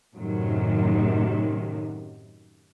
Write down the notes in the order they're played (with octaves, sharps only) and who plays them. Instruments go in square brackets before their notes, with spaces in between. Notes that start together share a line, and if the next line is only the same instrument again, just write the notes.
[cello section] F#2 A2 C3 D#3 F#3